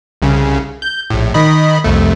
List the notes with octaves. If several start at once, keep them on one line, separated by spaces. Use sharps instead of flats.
C2 C#3
G6
A#1 A2
D#3 D#5 B5
C2 F2 A3